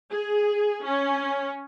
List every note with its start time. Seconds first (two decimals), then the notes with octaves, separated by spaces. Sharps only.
0.11 G#4
0.84 C#4